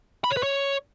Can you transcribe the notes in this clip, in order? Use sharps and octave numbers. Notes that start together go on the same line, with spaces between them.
B5
C#5
B4
C#5